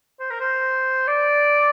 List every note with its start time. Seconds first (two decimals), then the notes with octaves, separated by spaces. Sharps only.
0.20 C5
0.30 A#4
0.40 C5
1.07 D5